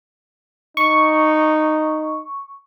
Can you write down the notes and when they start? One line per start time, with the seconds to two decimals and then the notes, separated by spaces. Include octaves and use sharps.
0.77 D#4 C#6